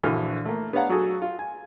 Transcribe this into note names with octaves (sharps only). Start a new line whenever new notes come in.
A#1 D3 E3 F#4 A4 F6
A3 A#3
B3 D4 C#5 F5 F#5 A#5
F#3 F#4 G#4 A4
F4
G#5